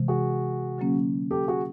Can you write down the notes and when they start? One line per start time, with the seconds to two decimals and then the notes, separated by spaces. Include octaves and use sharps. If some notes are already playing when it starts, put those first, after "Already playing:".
Already playing: C3 E3 G#3
0.08 F#4 G#4
0.78 D3 F#3 A#3 C#4
1.31 G4 A4
1.48 F#4 G#4